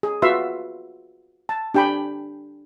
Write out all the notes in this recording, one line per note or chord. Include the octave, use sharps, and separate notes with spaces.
G#4
F4 F#4 B4 E5 F5 C6
A5
D4 G4 G5 G#5 B5